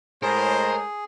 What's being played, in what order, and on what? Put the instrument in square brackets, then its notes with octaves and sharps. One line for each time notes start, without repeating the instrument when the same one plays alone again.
[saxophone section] A2 G#3 [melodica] G#4 [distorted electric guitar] A#4 [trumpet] C5